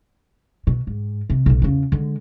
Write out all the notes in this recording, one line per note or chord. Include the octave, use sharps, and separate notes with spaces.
B2
G#2
C3
B1 A2
E2 C#3
D3 G#3